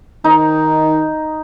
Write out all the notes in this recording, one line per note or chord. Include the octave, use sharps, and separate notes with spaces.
D#3 D#4